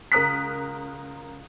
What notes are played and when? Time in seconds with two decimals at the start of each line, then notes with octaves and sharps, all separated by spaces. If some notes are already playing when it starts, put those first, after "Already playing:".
0.12 C#2 A#4 A#5 D#6 F#6 B6